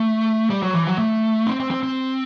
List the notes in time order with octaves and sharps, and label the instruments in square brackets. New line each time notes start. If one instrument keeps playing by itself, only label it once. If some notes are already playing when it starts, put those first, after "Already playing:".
Already playing: [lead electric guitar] A3
G3
F#3
E3
F#3
A3
C4
C4
C4
C4